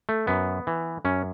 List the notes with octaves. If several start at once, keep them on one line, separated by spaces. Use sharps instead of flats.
A3
F#2 B3
E3
F#2 C#4